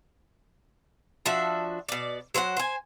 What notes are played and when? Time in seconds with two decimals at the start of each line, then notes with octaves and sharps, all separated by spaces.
1.25 F3 D4 F#4 E5
1.89 B2 D5
2.34 F#3 C5 E5 F#5
2.57 C5 G#5